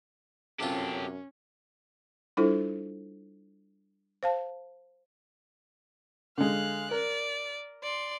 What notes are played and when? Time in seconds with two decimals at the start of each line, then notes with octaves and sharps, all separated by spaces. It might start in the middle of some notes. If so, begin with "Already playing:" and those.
0.60 F#2 C3 C#4 F4 G4 A4
2.37 G3 D4 E4 F4 A4 C5
4.23 C5 F5 A5
6.38 D3 G#3 F5 F#6
6.91 A#4 D5
7.83 D5 C6